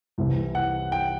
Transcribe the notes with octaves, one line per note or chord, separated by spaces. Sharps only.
C2 C3 E3
F#5
G5